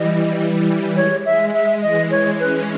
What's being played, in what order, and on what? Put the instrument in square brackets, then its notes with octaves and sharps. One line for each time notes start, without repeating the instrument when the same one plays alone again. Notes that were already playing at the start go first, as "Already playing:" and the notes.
Already playing: [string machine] E3 G3 [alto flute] D#5
[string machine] G3
E3
E3
[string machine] G#3 [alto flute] C#5
[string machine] G#3 [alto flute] E5
[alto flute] E5
[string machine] E3 [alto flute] D#5
[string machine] E3 [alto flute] C#5
[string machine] C#4 [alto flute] B4